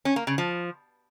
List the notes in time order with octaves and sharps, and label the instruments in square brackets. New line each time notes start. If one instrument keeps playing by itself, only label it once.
[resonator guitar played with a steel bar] C#4
A#3
C#3
F3